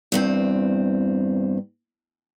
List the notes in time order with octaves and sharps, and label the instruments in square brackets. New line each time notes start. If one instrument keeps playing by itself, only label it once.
[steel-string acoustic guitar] E2 G2 C4